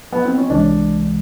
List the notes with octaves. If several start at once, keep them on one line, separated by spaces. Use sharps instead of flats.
B3
C4
C#4
C2 C3 E3 G#3 D4